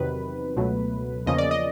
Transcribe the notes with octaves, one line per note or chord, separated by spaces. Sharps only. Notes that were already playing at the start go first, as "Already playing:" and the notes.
Already playing: E2 C3 D#3 F#3 B4
C#2 B2 F#3 A3
E2 C#3 F3 A#3 C#4 D#5
D5
D#5